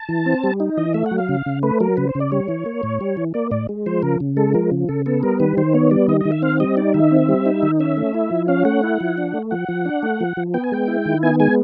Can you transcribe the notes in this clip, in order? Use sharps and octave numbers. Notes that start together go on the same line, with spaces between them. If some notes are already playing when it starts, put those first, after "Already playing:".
Already playing: A5
E3
C4
G3
D#4
E3 D#5
A3 E5
F#5
F#3
F5
C#3
C#3
A3 B4
F#3 A#4
C#3 B4
C5
C#3
D5
G3 C#5
E3
A#3
A2
G3
E3
A#3 D5
A2 D5
G#3
F3 C5
C#3 A#4
C#3
G#3 A4
F3 A#4
C#3
C#3 A4
B3 A4
G3 A#4
D#3 B4
D#3 C5
B3 C#5
G3 D5
D#3 D#5
D#3 D#5
E5
C4 F5
G3 D#5
D#4 D5
D#3 E5
C4
G3
D#4
D#3
C#4 E5
A3
E4
F3
C#4 F5
A3 F#5
E4
F3
D4
A3
F3 F#5
F3
D4
A3
F3
F3
B3 G5
G#5
G#3 G5
E4
D#3
B3 G#5
G#3 G#5